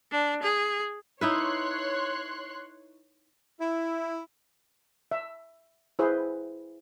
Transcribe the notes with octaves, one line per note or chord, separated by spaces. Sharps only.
D4
G#4
D#4 E4 B4 C#5 C6 F#6
E4
E5
E4 G#4 B4 C5